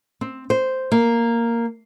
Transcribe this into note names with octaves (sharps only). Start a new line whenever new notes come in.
C4
C5
A#3